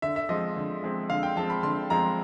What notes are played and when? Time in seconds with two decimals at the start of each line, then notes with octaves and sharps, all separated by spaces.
0.02 D3 E5
0.16 E5
0.29 F3 G#3 C4 D#5
0.56 D3
0.82 F3 G#3 C4
1.09 D3 F5
1.23 G5
1.36 F3 G#3 C4 A5
1.50 B5
1.63 D3 C6
1.90 F3 G#3 C4 A#5